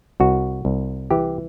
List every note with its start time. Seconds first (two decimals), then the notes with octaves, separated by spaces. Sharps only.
0.20 C2 F#4
0.65 C2
1.11 E3 G4